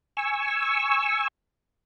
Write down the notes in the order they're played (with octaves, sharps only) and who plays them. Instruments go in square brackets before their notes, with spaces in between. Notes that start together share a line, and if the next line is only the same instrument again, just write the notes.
[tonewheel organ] G#5 C#6 E6